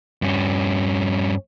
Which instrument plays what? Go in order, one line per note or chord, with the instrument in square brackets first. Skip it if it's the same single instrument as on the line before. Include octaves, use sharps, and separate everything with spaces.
[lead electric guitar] G2 C#4